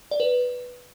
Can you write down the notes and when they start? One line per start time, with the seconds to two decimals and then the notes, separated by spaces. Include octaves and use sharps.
0.11 D5
0.20 B4